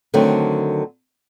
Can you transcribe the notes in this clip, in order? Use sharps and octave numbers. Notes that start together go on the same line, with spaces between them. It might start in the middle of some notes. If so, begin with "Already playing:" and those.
D3 D#3 F#3 A3 C4